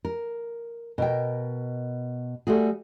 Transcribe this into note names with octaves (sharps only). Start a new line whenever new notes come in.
A#4
B2 A#4 G5
G3 A3 F#4 G#4